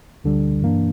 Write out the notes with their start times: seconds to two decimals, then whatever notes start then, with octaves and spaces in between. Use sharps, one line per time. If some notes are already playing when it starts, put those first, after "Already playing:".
0.24 D2 D3 G3
0.62 G2 E3 A#3 D4